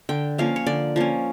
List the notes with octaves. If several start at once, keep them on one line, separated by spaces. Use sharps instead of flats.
D3 G5
F3 A#3 C#4 F5
C#5
D3 D5
F3 A#3 C#4